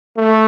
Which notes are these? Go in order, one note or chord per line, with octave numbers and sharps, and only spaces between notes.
A3